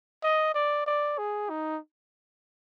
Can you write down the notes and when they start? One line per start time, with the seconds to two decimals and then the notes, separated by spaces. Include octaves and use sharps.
0.23 D#5
0.55 D5
0.87 D5
1.18 G#4
1.50 D#4